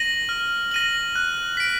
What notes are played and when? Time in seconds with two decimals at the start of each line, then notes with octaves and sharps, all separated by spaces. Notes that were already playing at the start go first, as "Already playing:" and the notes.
Already playing: A#6 D#7 F#7
0.29 F6
0.71 A#6 D#7 F#7
1.16 F#6
1.57 B6 D7